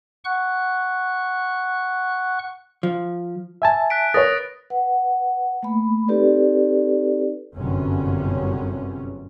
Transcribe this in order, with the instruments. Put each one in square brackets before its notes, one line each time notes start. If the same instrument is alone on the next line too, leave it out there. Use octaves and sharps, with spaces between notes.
[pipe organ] F#5 C#6 F#6
[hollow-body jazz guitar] F3
[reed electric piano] E5 G#5 A5
[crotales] F#6 B6 D7
[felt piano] A#4 B4 C#5 [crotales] D#6 A6 A#6
[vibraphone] B4 F#5
A3 A#3 B5
C4 D#4 G4 A4 B4 D5
[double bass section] G1 F#2 C3 C#4